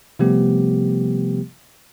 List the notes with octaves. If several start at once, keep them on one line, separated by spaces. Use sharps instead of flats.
C3 F3 G3 A3 B3 G4